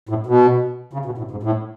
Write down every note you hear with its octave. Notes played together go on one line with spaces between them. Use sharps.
A2
B2
C#3
B2
A2
G#2
A2